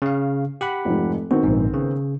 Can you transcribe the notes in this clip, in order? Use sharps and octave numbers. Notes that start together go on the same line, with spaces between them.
C#3 F5
G4 F#5 B5
F1 G#2 F3
D#3 B3 C4 F#4
A#1 G#2
C#3